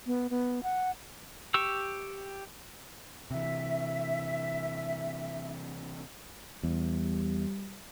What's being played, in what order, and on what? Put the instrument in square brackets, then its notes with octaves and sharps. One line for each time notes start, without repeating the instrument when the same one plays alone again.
[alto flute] B3
B3
F#5
[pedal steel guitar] G4 C#6 E6
[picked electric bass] C3 E3 [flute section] E5
[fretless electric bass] E2 [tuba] G3